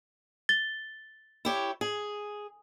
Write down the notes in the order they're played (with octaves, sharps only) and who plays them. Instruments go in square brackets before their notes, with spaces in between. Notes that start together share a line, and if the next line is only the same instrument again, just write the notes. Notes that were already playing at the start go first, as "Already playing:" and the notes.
[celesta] A6 G7
[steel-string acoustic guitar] E4 G4 C#5
G#4